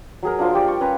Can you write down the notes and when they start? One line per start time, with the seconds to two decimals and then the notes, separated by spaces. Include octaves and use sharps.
0.23 F#3 G#4 A#4
0.39 D4 F4 C5
0.54 G3 G4 D5
0.68 C#6
0.81 C#4 B4 A#5